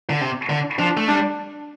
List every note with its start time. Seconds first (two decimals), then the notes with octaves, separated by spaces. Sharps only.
0.10 D3
0.21 C3
0.50 D3
0.78 F3 D4
0.97 A3
1.08 G3 D4